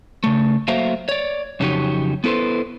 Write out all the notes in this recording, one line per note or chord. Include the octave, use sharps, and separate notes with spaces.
C#3 A3
F#3 A3 A#3 C5 E5 F5
C#5 D5
F2 C#3 F#3 D#4 G4 C#5
B3 E4 A4 B4 C5